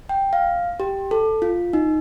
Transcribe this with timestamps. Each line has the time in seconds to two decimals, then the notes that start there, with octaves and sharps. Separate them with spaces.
0.09 G5
0.33 F5
0.80 G4
1.11 A4
1.42 F4
1.73 D#4